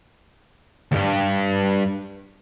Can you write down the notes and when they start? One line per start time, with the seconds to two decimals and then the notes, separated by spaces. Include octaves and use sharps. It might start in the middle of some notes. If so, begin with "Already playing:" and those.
0.92 D2 G2